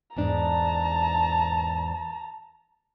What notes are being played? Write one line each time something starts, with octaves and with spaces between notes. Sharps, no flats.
E2 G#2 D4 A5 A#5